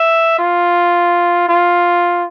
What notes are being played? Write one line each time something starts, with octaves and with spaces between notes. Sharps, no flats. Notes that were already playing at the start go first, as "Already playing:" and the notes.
Already playing: E5
F4
F4